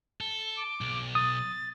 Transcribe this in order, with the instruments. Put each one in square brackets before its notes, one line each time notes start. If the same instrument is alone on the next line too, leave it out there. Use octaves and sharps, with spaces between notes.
[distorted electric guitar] A4 [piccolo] G7
[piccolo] D6
[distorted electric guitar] B1
[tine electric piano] D#6 [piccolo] A6